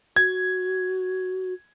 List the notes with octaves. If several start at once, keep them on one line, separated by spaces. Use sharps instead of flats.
F#4 G#6